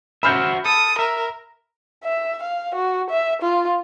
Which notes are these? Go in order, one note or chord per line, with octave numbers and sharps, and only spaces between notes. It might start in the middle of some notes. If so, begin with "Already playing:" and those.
F#4 C5 E5 B5 F6 G6
A4 D#6
A#4 E5
E5
F5
F#4
E5
F4